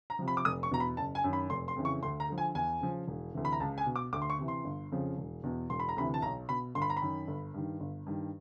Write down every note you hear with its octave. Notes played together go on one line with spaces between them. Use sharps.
A#5
C3 F3
B5
D6
F1 D#6
C#6
E2 B2 A#5
B5
F#1 A5
G#5
F#2 D#3
B5
F1 C6
C6
F2 C#3 E3
C#6
D2 C6
A#5
D3 F3
G#5
E2 G#5
C#3 F3
E1
D2 C3 E3
B5
A#5
C#2 A5
G#5
B2
D6
D2 D6
C6
C#6
C3 E3
C6
G1
F2 C#3 F3
E1
E2 B2
E1 C6
B5
A#5
D2 C3 E3 B5
A5
B1 A#5
B2 B5
G1 C6
B5
A#5
B5
F#2 D#3
G1
G2 D#3
G1
G2 D#3